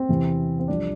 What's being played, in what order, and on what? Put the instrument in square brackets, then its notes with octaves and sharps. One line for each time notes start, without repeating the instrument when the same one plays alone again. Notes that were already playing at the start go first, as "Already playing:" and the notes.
Already playing: [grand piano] C4
E2 C3 E3
C4
C2 C3 F3 D4